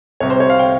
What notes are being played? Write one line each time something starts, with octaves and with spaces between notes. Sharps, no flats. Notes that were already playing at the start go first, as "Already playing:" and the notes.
C2 C3 G3 C#5
C5
C#5
F5
G5